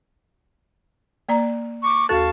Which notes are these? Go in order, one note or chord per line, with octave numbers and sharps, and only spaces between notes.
A#3 D5 A#5
C#6 D6
D#2 F#4 A4 F5 A5 C#6 A6